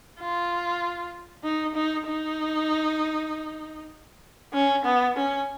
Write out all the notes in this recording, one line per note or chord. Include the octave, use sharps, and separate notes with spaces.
F4
D#4
D#4
D#4
C#4
B3
C#4